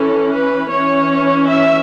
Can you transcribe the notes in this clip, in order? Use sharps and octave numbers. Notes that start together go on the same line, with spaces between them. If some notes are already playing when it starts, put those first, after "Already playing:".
Already playing: E3 C#4 A4
B4
E3 C#4 C#5
E5